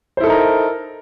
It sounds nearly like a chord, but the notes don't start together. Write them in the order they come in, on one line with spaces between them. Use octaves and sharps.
C5 E4 A4 D#4 A#4